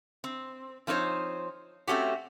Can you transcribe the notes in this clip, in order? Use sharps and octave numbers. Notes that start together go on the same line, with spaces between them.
C4
F3 C4 D#4 C5 C#5
A3 C4 C#4 F#4 G4